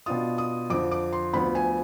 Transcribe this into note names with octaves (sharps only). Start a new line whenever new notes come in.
B2 B3 D4 F4 D#6
D#6
F2 D3 F3 D6
D6
C6
D2 D3 F3 B3 B5
G#5